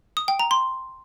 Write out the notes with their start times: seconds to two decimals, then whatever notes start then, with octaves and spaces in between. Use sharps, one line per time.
0.17 D#6
0.28 G5
0.39 A#5
0.51 C6